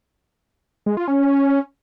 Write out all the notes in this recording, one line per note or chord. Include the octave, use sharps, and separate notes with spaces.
G#3
F4
C#4